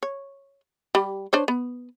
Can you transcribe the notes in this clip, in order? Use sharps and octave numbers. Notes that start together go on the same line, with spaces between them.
C#5
G3 G4
D4 C5 C#5
B3